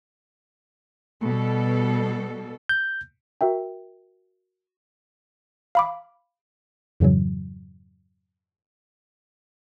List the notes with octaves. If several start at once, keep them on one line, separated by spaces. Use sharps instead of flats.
B2 G3 A4
G6
F#4 A#4 E5 G5
F5 B5 D6
F2 G#2 C#3 E3 F#3